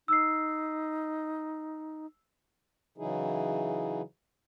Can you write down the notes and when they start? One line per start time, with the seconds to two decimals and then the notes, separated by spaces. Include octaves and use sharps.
0.08 D#4 E6 C7
2.98 C#3 E3 F#3 D#4 E4 G#4